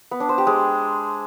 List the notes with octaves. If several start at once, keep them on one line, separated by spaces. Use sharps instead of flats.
B3
D4
C5
G4
G#3